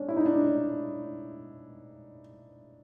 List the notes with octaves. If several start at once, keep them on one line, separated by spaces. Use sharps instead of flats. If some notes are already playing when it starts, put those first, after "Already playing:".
Already playing: C#4 D4
E4
D#4
D4